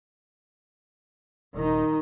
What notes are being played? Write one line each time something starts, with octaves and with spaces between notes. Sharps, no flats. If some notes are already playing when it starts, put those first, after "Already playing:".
D#1 D#3 D#4